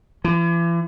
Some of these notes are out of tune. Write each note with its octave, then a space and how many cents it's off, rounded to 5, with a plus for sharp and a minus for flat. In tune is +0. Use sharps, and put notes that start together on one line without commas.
E3 +40